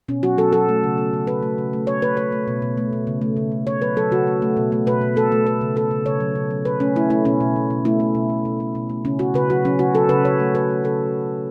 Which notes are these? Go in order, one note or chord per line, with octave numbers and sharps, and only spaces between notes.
B2 C#4
F#3 F#4
F#3 A4
F#3 A4
A3
C#3
A3
C#3
C#3 B4
A3
C#3
A3
A3 C#5
A3 B4
A3 C#5
A3
B2
B2
A3
B2
C#3
A3
C#3
C#3
A3 C#5
F#3 B4
F#3 A4
C#3 F#4
A3
A3
B2
A3
B2 B4
B2
A3 A4
A3
A3 B4
C#3
A3 A4
C#3
C#3 C#5
F#3
C#3
F#3
B2 B4
A3 C#4
A3 E4
A3 E4
B2 C#4
B2
B2
B2
A3 E4
A3
B2
B2
B2
A3
B2
A3
C#3 C#4
C#3 F#4
C#3 B4
F#3 F#4
F#3 C#4
C#3 F#4
F#3 A4
C#3 B4
C#3 C#5
A3
C#3 B4
A3
C#3 A4